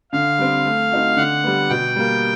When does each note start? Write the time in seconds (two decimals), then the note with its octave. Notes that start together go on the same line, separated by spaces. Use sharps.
0.12 D3 F5
0.38 G3 C4
0.65 A3
0.92 C4 D#4 F#4
1.17 D3 F#5
1.44 G3 B3
1.69 B2 G5
1.96 G3 A#3